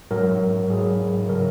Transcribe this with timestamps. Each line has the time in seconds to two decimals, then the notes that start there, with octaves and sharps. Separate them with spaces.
0.11 G#2 F#3 A#4
0.69 G#2 F#3 G#4
1.29 C#3 F#3 A#4